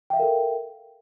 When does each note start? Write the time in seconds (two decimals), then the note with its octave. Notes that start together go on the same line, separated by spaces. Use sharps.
0.10 G5
0.13 E5
0.16 F5
0.19 A#4
0.22 A4